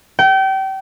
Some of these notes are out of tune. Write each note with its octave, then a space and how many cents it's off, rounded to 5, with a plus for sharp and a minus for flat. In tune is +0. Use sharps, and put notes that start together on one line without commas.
G5 -30